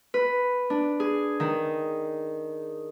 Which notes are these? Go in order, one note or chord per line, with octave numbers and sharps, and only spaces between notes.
B4
D4
G#4
D#3